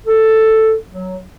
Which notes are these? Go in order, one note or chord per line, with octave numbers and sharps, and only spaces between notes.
A4
F#3